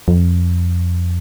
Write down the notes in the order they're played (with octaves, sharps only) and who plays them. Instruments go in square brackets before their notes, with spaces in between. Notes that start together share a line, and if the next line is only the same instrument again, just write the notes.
[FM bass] F2